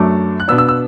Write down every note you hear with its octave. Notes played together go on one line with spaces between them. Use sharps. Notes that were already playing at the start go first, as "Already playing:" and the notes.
Already playing: F#2 F#3 A3 D4 D6
F#6
B2 B3 D4 E6
E6
E6